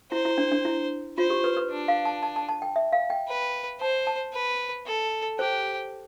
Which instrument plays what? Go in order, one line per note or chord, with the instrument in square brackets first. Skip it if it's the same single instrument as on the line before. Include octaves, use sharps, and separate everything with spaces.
[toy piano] E4 [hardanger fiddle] C5
[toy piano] E4
D4
D4
E4
[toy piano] F4 [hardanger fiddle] C5
[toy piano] G4
B4
B4
[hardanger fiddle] D4
[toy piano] F5
A5
A5
A5
A5
G5
E5
F5
G5
[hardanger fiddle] B4
[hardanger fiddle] C5 [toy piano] A5
[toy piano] A5
[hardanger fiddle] B4
A4
[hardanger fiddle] G4 [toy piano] C5